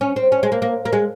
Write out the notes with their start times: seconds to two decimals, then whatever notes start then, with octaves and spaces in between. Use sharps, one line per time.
0.01 C#4
0.16 C4
0.32 C#4
0.43 G#3
0.52 A#3
0.62 A#3
0.85 A#3
0.93 G#3